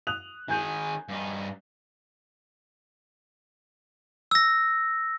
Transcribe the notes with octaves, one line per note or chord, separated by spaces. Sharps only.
D#6 F#6 F7
D#3 G#4 G#5 G6
G2 D#4
E6 A#6